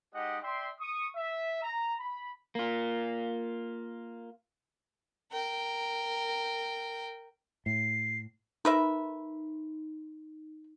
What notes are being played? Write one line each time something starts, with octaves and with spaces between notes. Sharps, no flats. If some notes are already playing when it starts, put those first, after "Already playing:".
G#3 D#4 G4 D#5 F#5
D5 E5 G5 C6
C#6 D#6
E5
A#5
B5
A#3 F4
A#4 G5
A2 C7
D#4 A#4 B4 E5